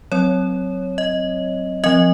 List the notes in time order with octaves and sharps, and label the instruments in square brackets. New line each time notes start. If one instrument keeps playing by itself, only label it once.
[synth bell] F#3 C4 C#5
D#5
F3 C4 D#5